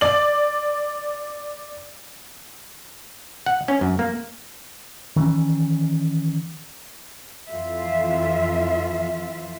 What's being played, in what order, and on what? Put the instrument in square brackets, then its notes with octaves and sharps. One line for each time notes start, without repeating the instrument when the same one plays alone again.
[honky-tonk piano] D5 F#7
[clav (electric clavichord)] F#5
C#4
F#2
A#3
[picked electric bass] D#3 E3 C#4
[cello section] F2 E3 F4 E5